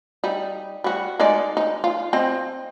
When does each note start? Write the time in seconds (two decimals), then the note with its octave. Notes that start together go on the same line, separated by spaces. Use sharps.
0.24 G3 D#4
0.84 G3 F#4
1.20 G#3 D#4 D5
1.57 D#4
1.84 F4
2.13 C4 D#5